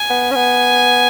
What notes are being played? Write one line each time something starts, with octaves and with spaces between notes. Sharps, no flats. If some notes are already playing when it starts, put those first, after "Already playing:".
Already playing: G#5
B3
C#4
B3 G#5